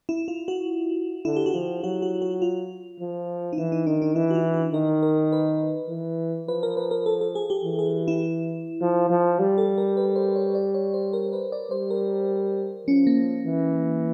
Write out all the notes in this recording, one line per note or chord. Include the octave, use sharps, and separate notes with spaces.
E4
F4
F#4
D3 E4
G4
F#4
F3 F4
F#3 F#4
F#4
F#4
F4
F3
D#4
E3 E4
D#4
D#3 D4
D4
E3 E4
F#4
F4
F#4
D#3 A#4
A#4
B4
E3
F3 B4
A#4
B4
A#4
A4
A4
G#4
G4
E3
G#4
E4
F3
F3
G3
A4
A#4
B4
C5
C#5
D5
C#5
C5
A#4
B4
D5
G3 C5
A#4
F3 C#4
A#3
E3